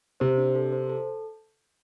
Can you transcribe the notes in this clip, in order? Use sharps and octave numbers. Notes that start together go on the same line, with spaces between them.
C3 C5
D4
A4
C5
A4